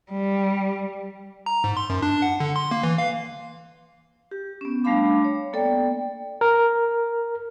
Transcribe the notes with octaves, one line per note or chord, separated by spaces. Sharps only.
G3
A#5
G#2
C6
F#2
D4
F#5
D3
C6
A#3
E3
F5
G4
B3 C#4
G3 A3 D4 F5 B5 D6
C#5
A#3 B3 A4 D5 G5
A#4